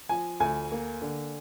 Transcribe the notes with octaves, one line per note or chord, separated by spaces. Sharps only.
F3 G#5
D2 G#5
A#3
D3